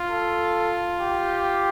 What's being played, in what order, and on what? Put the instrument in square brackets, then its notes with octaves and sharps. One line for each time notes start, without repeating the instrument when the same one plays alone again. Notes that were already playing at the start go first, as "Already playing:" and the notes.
Already playing: [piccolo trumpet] F4
[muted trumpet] A4
G4